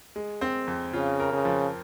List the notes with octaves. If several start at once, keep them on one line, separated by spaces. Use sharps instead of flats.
G#3
C4
F2
C#3 F4
A#4
C#3
F3